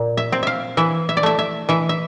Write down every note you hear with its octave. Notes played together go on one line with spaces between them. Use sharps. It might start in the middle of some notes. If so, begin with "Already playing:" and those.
Already playing: A#2
E5
C4
E5 F5
E3 E5
E5
D5
A3 E5
E5
E3 E5
E5